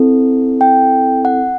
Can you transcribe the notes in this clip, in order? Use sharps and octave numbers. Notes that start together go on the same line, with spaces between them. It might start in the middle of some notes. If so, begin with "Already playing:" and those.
Already playing: C4 E4 A4
G5
F#5